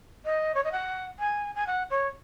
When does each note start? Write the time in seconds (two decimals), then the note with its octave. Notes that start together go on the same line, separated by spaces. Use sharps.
0.25 D#5
0.55 C#5
0.64 D#5
0.72 F#5
1.19 G#5
1.55 G#5
1.67 F#5
1.91 C#5